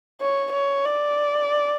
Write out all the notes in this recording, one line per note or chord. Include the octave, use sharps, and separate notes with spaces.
C#5
C#5
D5